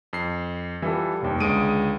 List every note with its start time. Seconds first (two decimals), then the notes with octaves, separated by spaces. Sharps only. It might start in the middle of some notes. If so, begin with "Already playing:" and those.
0.13 F2 C7
0.82 E3 G3 F4 A4
1.21 F1 D#2
1.40 C#2 D3 G#3 D#6 D7 D#7